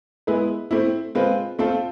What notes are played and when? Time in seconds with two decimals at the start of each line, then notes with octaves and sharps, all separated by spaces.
0.27 G#3 B3 E4 G#4 B4
0.71 A3 C4 E4
1.15 G#3 C4 F4 B4
1.59 A3 C4 F4 A4 C5